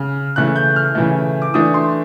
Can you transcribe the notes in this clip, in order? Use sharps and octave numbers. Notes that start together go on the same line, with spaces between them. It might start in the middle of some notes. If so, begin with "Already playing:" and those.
Already playing: C#3 F6
C#3 E3 A3 F#6
G6
F6
C#3 E3 A3
D6
E3 A3 D4 D#6
C6